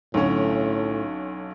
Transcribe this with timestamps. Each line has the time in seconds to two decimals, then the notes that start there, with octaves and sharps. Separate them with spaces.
0.14 B1 A2 D3 C#4